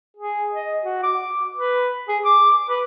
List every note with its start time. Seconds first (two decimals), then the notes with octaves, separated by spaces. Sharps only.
0.17 G#4
0.52 D#5
0.83 F#4
1.03 D6
1.55 B4
2.08 G#4
2.24 D6
2.51 D6
2.69 B4